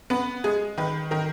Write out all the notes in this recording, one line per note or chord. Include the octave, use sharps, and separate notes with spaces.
B3 B4
G#3 G#4
D#3 B4
D#3 A#4